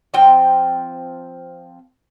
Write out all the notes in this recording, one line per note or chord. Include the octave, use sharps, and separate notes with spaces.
F3 C4 G5